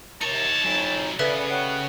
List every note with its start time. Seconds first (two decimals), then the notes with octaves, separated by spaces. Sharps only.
0.21 D#2 C3 D#4 C#5 A5 C#7
0.64 F2 F#3 C#4 D#4 E4
1.19 E2 C#3 B3 A4 B4 D5 E5
1.50 G4 C#5 F#5